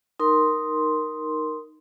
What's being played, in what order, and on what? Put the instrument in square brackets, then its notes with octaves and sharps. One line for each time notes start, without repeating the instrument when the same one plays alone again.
[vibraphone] D#4 A#4 C6